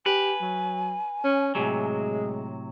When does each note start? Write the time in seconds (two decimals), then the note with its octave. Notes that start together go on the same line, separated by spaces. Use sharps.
0.06 G4 B4 G#5
0.41 F#3
1.24 C#4
1.55 A2 C3 F#3 G#3